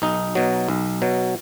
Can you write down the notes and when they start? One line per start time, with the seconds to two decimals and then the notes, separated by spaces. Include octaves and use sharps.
0.02 B1 D#4
0.35 B2 F#3
0.68 B1
1.02 B2 F#3